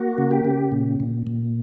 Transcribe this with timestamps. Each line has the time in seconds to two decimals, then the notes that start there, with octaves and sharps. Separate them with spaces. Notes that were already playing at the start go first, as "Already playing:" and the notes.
Already playing: A#3 F#4
0.18 C#3
0.31 G4
0.45 C#3
0.72 A#2
1.00 A#2
1.27 A#2